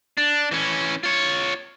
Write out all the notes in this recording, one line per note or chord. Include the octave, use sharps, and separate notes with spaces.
D4
E3 C#4
F4 C#5